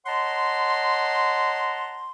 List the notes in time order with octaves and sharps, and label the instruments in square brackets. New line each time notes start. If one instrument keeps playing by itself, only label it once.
[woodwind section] C#5 D#5 F#5 A5 A#5 C6